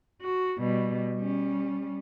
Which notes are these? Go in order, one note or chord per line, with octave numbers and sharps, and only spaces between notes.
F#4
B2 G3
G3 C#4